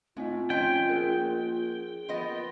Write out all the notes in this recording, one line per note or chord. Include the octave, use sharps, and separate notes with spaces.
A2 A3 C4 F4 D#5
F3 C#4 D#5 G5
A#3 G#4 A#4
F3 B3 D#5